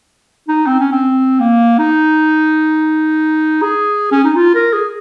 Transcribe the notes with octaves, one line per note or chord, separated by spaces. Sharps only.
D#4
C4
C#4
C4
A#3
D#4
G#4
C#4
D#4
F4
A#4
G#4